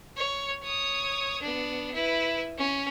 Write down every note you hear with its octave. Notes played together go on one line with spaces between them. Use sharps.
C#5
C#5 D#6
B3 D4
E4 B4
C#4